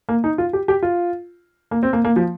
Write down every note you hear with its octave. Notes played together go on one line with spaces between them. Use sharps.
A#3
D#4
F4
G4
G4
F4
A#3
C4
A#3
A#3
F3